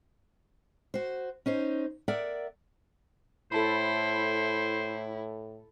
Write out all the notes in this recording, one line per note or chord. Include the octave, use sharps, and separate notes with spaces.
F#4 C5
C#4 D#4 C5
A#4 D5 E5 F#5
A2 E4 A4 C5 A5 B5